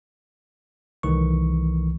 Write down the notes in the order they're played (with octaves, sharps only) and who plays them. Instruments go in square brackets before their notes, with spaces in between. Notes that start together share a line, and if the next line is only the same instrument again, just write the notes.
[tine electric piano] C2 D#3 E3 A3 C#6